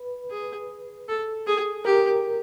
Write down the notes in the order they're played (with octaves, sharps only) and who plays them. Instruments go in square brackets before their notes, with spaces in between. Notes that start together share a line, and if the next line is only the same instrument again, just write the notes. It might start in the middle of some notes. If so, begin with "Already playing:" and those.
Already playing: [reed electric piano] B4
[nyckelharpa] G#4
A4
G#4
[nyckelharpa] G4 [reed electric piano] A#4